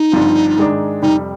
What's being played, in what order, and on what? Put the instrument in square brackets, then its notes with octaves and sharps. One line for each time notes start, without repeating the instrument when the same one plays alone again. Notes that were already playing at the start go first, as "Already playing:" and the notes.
Already playing: [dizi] D#4
[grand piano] G1 G2 F3 C4
G#2 D#3 G#3 D4
[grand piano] F2 C3 G3 [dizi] D#4